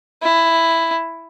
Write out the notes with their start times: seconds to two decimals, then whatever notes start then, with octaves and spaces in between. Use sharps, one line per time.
0.22 E4